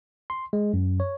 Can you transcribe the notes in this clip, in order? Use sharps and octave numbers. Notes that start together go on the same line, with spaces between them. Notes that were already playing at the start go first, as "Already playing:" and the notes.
C6
G#3
F#2
C#5